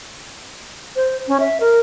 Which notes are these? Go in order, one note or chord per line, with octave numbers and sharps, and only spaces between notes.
C5
C#4
E5
A#4